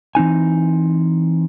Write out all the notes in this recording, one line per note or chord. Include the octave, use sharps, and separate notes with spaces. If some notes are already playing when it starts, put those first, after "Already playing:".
E3 C4 D#4 G#5